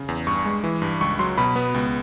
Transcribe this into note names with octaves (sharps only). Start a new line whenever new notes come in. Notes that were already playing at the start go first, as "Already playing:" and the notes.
Already playing: C#3
E2
G2 C#6
G#3
E3
G2
C#2 C#6
F#3 C6
B2 B5
B3
C#2